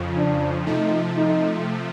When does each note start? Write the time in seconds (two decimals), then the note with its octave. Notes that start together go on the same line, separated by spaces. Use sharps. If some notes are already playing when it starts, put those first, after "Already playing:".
Already playing: F2 C#3 F3
0.17 D4
0.67 C3 F3 A3 D#4
1.17 D#4